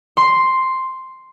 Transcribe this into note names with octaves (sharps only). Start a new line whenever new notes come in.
C6